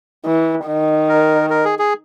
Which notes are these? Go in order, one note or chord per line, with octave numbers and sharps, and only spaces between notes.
E3
D#3
A#4
A#4
G#4
G#4